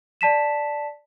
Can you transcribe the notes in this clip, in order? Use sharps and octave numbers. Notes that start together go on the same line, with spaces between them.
D5 A5 B6 E7